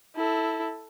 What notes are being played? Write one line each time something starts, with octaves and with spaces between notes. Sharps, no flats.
E4 A4